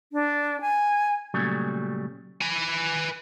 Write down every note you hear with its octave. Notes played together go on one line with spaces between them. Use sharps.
D4
G#5
A#2 C#3 F#3 G3 A3
B4 G#5